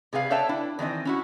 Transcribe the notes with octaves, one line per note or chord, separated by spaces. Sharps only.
C3 G#4 B4 F5
A4 B4 C#5 E5 G5 A5
D4 E4
D#3 E3 C4 D#5
C#4 E4 F#4